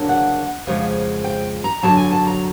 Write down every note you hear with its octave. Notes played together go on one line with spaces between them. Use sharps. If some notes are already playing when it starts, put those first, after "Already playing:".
Already playing: D2 C#3 F#3 A#3 D4
F#5
F2 C#3 F3 G#3
G5
A#5
F#2 D3 F#3 A5
G#5
A5
A#5